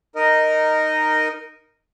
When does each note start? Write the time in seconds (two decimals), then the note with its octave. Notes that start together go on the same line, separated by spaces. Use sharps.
0.16 D#4 A#4 D#5